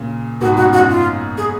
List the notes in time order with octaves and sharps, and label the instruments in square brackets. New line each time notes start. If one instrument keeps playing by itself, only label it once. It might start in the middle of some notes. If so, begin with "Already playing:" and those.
Already playing: [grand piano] A#2 C#3
[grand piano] G#2 B2 [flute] F#4
[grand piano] G#2 [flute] F#4
[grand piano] F#2
[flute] F#4
[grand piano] F#2
[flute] F4
G#4